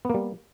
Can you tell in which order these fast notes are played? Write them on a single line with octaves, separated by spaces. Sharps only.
B3 A#3 G3